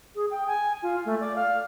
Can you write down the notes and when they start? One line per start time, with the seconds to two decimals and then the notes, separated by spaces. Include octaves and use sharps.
0.15 G#4
0.31 G5
0.47 G#5
0.82 F4
1.05 A3
1.20 D5
1.35 F5